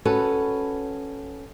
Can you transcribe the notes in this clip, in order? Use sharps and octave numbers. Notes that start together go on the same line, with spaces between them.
C#4 F#4 A4 B4